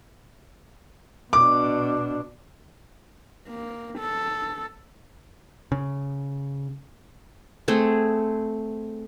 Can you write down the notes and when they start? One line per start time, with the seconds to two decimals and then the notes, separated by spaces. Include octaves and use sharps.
1.33 B2 D4 D6
3.48 A#3
3.98 A4
5.72 C#3
7.68 A3 C4 G#4